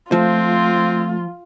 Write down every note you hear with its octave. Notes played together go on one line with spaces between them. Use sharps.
F3 A3 C4 F4